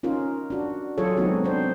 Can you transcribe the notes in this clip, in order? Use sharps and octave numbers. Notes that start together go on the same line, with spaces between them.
C#4 D#4 F4 A#4
D4 F#4
F#3 F4 G#4 A4 C#5
F#3 G#3 B3 C4 D#4 F#4
C4 D4 C5